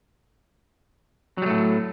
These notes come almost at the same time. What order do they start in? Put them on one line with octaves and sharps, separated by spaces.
F#3 G3 A3 A2